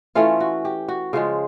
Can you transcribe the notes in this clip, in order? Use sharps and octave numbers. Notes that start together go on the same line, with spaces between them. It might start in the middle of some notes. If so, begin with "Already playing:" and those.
E3 A3 C#4 F4
F#4
G4
F#4
C#3 F3 G#3 F4